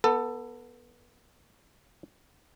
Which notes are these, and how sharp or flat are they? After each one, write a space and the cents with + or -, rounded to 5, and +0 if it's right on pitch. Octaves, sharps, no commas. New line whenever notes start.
B3 -20 A4 +15